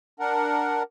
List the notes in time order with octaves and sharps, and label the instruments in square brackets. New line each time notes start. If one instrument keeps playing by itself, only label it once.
[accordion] D4 A#4 F#5